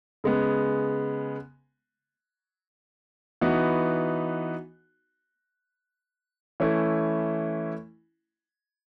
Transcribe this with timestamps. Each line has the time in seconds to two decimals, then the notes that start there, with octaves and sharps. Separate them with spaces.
0.24 C#3 G#3 B3
3.41 E3 B3 D#4 F#4
6.60 E3 A3 C#4 E4